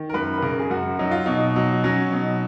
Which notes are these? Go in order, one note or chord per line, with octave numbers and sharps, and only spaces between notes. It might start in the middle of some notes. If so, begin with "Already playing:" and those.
Already playing: D#3
A#4
F#2 B4
B4
C#3 A#4
G#4
F#2 F#4
F#3 D#4
F4
B2 D#4
F#3
F#3 C#4
B2 D#4